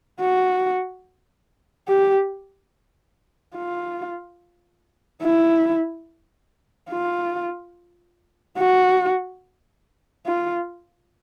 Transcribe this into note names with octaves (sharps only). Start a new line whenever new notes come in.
F#4
G4
F4
E4
F4
F#4
F4